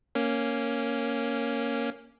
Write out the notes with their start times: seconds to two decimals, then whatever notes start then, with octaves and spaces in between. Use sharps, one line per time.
0.15 A#3 C#4